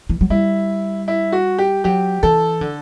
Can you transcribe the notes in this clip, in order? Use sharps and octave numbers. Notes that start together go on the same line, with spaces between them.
E3
F#3
G3 E4
E4
F#4
G4
F#3 G4
E3 A4
D3